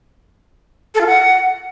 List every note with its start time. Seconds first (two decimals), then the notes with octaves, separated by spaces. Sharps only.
0.95 A4
1.01 F4
1.07 F#5